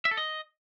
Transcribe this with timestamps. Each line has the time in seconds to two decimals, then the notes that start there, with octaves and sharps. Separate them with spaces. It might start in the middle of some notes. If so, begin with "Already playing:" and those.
0.05 E5
0.11 A4
0.17 D#5